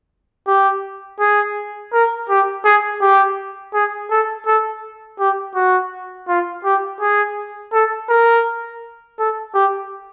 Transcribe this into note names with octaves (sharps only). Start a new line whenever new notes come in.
G4
G#4
A#4
G4
G#4
G4
G#4
A4
A4
G4
F#4
F4
G4
G#4
A4
A#4
A4
G4